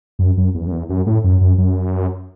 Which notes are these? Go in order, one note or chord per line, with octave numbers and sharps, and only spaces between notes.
F#2
F#2
E2
F#2
E2
F#2
A2
F#2
F#2
F#2